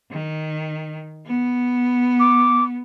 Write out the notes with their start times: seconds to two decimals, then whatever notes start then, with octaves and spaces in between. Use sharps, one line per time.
0.11 D#3
1.27 B3
2.19 D6